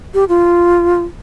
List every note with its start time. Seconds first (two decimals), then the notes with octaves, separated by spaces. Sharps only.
0.14 G4
0.29 F4